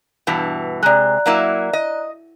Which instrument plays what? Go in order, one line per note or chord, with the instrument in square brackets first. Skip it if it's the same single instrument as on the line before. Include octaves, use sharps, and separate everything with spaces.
[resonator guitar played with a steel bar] G2 B2 E3
[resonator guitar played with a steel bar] C3 G#3 [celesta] D5 A#5 F#6
[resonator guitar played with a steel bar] F#3 A#3 E4
D#5